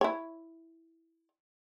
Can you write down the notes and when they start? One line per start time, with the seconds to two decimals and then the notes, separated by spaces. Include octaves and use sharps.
0.01 E4 C#5